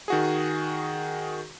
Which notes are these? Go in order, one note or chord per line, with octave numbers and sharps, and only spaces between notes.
D#3 F#4 G#4